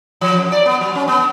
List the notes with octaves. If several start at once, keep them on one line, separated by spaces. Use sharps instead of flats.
F3
F#2
D5
B3
F#3
C#4
B3